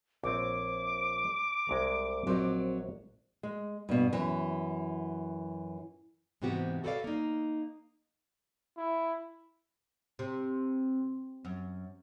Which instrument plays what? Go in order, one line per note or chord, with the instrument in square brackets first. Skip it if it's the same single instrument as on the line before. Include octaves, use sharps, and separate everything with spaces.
[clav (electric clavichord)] A#1 C4 [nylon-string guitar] C#5 [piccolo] D6
[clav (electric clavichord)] C2 G#3 A#5
[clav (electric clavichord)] A#1 C5 D#5 [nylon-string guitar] F#3 C4
[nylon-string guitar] G#3
G2 B2
F#2 E3
G#2 C3 E3 B3 F#4 G4
F#4 A4 B4 C#5 D5 F5
A#3 D#4
[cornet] E4
[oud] C3
F#2